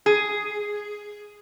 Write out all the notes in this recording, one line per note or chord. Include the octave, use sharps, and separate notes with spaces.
G#4